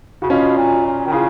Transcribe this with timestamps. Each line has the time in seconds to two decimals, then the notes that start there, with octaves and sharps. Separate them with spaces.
0.22 C#3 F#4
0.30 B2 C#4 F4
0.57 A#2
0.86 A#2
1.06 D#3
1.12 C#3 F4 G#4